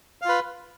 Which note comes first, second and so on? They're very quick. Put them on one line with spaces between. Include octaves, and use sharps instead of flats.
F5 F4 B4